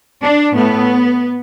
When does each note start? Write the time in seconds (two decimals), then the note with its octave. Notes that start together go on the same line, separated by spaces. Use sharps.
0.22 D4
0.55 A2 A3 B3